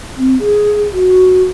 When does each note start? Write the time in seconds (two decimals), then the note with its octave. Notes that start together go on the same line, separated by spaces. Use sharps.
0.17 C4
0.39 G#4
0.93 F#4